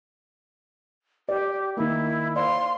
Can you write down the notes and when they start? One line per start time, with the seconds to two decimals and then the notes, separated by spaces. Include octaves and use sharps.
1.29 G4 D5
1.77 D#3 A#3 E4
2.36 C5 D5 F5 C6